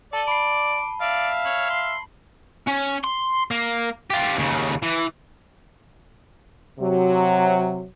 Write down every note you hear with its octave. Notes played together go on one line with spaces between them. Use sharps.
A4 D5 A5 D#7 G7
B5 D6 C7
D5 E5 F5
C#5 F#7
C6
C#4
C6
A#3
F4 G4
D#2 C#3
E3
C3 F#3